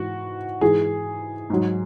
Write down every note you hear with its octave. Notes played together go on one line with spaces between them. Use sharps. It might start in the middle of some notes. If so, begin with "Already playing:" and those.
Already playing: G#2 E3 F#4
G#2 E3 G#4
G#2 F#3